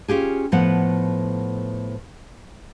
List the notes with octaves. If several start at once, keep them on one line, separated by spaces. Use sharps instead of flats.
C#4 F4 G4 G#4
A2 F3 A3 B3 F#5